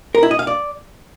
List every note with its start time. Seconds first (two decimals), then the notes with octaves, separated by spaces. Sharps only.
0.15 A#4
0.23 E4
0.31 D#5
0.39 F5
0.47 D5